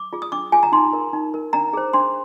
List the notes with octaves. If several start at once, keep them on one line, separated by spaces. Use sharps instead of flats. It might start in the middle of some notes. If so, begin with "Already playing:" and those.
Already playing: D6
F4 G#4
D#6
D4 D6
F4 G#4 G#5
A#5
D#4 C6
A#4
D#4
A#4
D4 A#5
G#4 C5
D4 C6